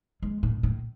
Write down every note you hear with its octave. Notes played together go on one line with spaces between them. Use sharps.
G#3
A2
A2